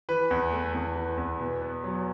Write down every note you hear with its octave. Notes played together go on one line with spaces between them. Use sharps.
E3 B4
E2
A3
E2
E3
E2
B2
B3
F#3